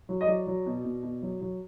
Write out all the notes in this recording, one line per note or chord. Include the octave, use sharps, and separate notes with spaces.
F#3
D#5
F#3 D5
F#3
B2
B2
B2
F#3
F#3